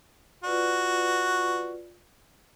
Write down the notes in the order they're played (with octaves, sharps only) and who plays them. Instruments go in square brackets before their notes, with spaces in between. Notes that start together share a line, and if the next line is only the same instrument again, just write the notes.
[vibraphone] F4 B4 D5 [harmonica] F#4